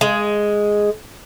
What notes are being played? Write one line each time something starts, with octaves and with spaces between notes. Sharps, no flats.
G#3